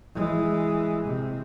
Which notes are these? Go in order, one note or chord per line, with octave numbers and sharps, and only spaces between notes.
E3 G#3
C3